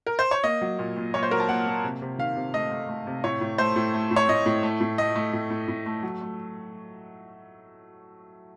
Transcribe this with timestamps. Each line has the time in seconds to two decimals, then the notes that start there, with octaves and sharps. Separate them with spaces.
0.07 A#4
0.19 C5
0.31 C#5
0.44 A#3 D#5
0.62 F#3
0.79 A#2
0.97 A#2
1.14 A#2 C#5
1.23 C5
1.31 F#3 A#4
1.40 A5
1.49 A#3 F#5
1.66 A#3
1.84 C3
2.02 C3
2.19 D#3 F5
2.37 C3
2.54 A3 D#5
2.71 A3
2.89 A3
3.07 C3
3.24 A2 C#5
3.41 A2
3.58 A3 C5
3.76 A2
3.93 A3
4.11 A2
4.16 C#5
4.29 A2 D#5
4.46 A2
4.63 A3
4.81 A2
4.98 A3 D#5
5.16 A3
5.33 A2
5.50 A2
5.68 A2
5.86 A3
6.03 F#3
6.21 A3